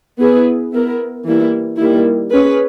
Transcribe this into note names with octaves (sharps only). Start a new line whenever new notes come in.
B3 E4 G#4 B4
B3 E4 A#4
E3 G3 A#3 E4
D#3 G3 A#3 E4
C#4 G#4 B4